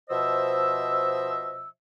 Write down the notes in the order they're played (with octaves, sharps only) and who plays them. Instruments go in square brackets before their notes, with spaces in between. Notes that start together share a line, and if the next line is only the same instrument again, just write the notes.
[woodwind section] B2 F3 C5 D#5 E5 E6